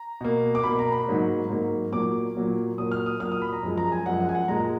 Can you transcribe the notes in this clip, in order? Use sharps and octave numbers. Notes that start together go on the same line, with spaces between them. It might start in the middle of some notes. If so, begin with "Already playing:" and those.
Already playing: A#5
B2 A#3
D6
B2 A#3 B5
A#5
B5
G#2 F#3 A#3
G#2 F#3 A#3
A#2 F#3 A#3 D6
A#2 F#3 A#3
A#2 F#3 A#3 D#6
F6
D#6
A#2 F#3 A#3 F6
D#6
B5
A#5
F#2 F3 G#3
A#5
G#5
F#2 F3 G#3 F#5
F#5
G#5
F#5
A#2 G#3 A#5